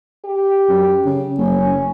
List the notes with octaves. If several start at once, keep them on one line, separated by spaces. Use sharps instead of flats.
G4
F#2
C#3
F#1 C#4